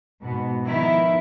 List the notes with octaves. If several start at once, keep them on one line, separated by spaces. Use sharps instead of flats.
G#2 B2 B3
D#3 F3 B3 D#4 E4